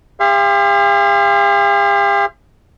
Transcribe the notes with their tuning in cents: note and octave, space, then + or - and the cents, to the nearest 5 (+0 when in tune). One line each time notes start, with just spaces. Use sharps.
G4 +45 F5 -40 C6 +0